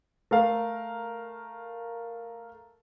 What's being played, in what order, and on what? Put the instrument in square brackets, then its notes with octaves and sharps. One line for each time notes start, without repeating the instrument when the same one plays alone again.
[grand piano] A3 A#4 F5